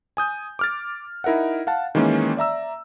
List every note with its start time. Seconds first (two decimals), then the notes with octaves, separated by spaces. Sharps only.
0.17 G#5 D#6 G6
0.59 D6 F6 A6
1.24 D#4 E4 A#4 E5 F#5
1.67 F5 F#5 A5
1.95 D#3 E3 G#3 A#3 C#4
2.37 D5 E5 A#5 E6